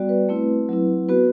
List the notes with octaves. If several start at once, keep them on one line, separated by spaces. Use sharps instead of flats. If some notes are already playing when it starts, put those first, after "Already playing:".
Already playing: G3 B3 F#4 D5
B4
A3 C4 E4
F#3 C4 E4
B3 F#4 B4